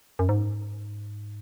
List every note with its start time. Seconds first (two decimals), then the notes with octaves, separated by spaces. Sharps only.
0.19 F#2
0.29 G#2